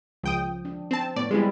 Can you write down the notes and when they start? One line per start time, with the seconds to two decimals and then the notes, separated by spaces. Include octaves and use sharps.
0.24 C#2 F3 G5 D#6
0.65 D4
0.91 C4 A5
1.16 A2 B3 D5
1.31 G3 G#3 C4 E4 G#4